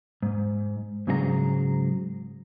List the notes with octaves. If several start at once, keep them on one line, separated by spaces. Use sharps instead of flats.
G#2
G#2 C#3 F#3 G#4 C5 A#5